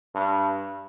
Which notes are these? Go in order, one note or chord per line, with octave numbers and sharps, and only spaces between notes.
G2